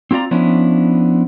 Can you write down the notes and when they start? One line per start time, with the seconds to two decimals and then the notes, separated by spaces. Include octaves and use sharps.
0.11 C4 E4 F4 D5 A#5
0.31 F3 B3 C#4 D4 E4